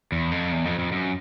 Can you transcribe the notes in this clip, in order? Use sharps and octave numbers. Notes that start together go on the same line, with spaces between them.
E2
F2
E2
F2
F2
F#2